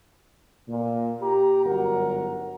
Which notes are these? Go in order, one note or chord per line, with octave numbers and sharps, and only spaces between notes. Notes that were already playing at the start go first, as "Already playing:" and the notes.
A#2
G4 A#5
G1 F#2 F#4 A#4 F#5 A#5